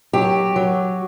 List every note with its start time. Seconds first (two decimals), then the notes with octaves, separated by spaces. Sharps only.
0.13 F#3 G4
0.56 F#3